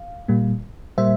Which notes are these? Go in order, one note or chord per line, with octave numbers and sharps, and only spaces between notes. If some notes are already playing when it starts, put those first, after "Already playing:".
Already playing: F5
A#2 G3 A#3
A#2 G3 A#3 C5 E5